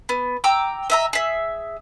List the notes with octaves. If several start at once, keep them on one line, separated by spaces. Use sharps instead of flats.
B3
G5 A#5 D6 E6
D#5 E5 A#5
G#4 E5